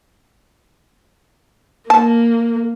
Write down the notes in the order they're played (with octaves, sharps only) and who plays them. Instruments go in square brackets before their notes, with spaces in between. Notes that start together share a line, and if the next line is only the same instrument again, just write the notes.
[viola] A#3 [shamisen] A5